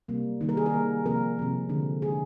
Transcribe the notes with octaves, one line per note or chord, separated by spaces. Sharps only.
C3 G3 A#3
D#3 G3 A#3
A#4
G#4
A#4
D#3 G3 A#3
C3 F3 A#3 A#4
C3 F3 A#3
D3 G#3
D3 G#3 G#4